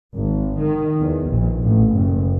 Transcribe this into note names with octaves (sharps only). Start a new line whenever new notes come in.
G#1
D#3
E2
A#1
A1
F#1